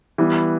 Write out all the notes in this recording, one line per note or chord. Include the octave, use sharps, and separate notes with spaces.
E3 G3 B3